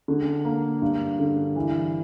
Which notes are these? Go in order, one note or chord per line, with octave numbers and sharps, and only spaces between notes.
D3
A#3
G2
D3
E3